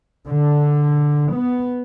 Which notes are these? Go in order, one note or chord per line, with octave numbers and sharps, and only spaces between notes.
D3
B3